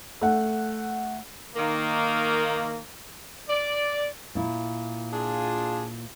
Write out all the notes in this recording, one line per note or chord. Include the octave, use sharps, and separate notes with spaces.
A3 F#5
D#3 A#3
D5
A#2 E4
D4 F4 G#4